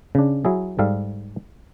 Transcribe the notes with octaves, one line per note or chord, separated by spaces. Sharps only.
C#3 D4
F#3 E4 G#4
G#2 G3 A4 F5